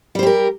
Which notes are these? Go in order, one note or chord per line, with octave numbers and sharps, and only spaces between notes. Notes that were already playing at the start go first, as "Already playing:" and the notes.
G3 G4 A#4 C5